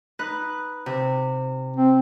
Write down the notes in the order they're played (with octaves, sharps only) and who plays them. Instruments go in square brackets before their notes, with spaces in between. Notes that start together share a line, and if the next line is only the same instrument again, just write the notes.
[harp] D#4 B4 F#6
C3
[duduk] C4